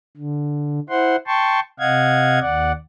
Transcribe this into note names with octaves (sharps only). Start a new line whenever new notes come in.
D3
E4 C5 F#5 C6
G5 A5 C6 C#6
C3 D#5 F5 F#5 G#6
D#2 D5 F#5